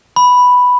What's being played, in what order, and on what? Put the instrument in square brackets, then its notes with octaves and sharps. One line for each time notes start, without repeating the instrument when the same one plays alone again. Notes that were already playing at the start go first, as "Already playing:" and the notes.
[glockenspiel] B5